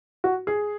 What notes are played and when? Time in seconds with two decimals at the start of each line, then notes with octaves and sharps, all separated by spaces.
0.24 F#4
0.47 G#4